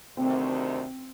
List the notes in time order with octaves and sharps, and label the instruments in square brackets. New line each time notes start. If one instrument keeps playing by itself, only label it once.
[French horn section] D2 C3 D#3 [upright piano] C4